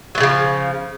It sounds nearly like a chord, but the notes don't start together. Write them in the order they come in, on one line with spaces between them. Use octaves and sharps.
F#3 A#2 C#3 F3